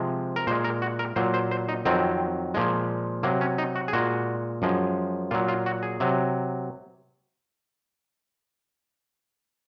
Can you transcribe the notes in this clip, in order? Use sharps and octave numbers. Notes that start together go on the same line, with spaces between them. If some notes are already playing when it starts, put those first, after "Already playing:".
Already playing: C3 F3 G#3
A#4
A#2 G#3 C5
A#4
F#4
A#4
A#2 F#3 C5
C5
C5
D#4
F2 D#3 F#3 C4
A#2 F3 G#3
C3 F#3 A#3
C#4
D#4
F#4
G#4
A#2 G#3 F#4
F#2 F3 G#3
A#2 F#3 F4
F4
F#4
G#4
C3 F#3